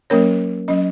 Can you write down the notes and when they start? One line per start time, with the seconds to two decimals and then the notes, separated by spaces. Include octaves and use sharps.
0.10 F#3 A#3 C#4 A#4 C#5
0.68 F#3 C#4 D#5